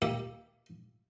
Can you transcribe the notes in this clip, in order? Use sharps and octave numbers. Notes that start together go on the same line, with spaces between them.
A#3 G4 E5